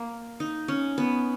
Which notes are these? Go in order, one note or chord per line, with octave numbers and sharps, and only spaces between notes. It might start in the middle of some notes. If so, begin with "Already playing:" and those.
Already playing: A#3
D#4
C#4
B3